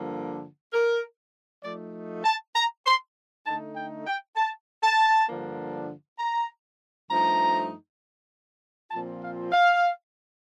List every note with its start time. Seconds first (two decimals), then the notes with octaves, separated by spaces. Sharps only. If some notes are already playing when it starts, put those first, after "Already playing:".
Already playing: G2 D3 F3 A#3
0.73 A#4
1.63 F3 A3 D#4 D5
2.24 A5
2.55 A#5
2.86 C6
3.45 D3 A3 D#4 A5
3.76 G5
4.06 G5
4.36 A5
4.82 A5
5.27 G2 D3 F3 A#3 D4
6.18 A#5
7.09 G2 F3 A3 D#4 A#5
8.91 A#2 F3 C4 F4 A5
9.21 F5
9.52 F5